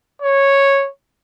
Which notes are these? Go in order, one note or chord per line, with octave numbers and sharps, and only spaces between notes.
C#5